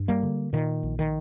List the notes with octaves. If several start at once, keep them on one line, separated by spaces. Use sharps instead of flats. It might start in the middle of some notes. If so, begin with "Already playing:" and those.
Already playing: G2
G3 A#3
D3
A#2 D#3
A#1
D#3